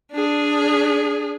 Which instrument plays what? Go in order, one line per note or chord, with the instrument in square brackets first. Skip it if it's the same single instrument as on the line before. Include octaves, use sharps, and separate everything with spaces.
[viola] D4 G#4